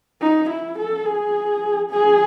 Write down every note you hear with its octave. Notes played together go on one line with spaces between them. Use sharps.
D#4
E4
A4
G#4
G#4